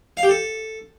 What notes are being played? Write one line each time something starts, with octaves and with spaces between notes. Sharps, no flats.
F5
G4
A4